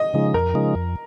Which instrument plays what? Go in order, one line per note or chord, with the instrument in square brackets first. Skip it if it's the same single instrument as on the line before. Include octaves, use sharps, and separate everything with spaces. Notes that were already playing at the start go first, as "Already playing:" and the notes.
Already playing: [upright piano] D#5
[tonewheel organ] C#3 F3 G#3 D#4
[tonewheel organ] F2 [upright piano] A#4
[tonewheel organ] C#3 F3 G#3 D#4
F2